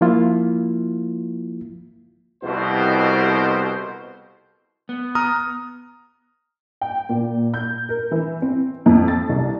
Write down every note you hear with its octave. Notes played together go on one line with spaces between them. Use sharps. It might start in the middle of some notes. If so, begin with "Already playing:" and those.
F3 A#3 E4 F4
C2 F2 B2 C5
B3
A#5 D#6 F6
G5
A#2
G6
A#4
E3
C4
F2
A6
C2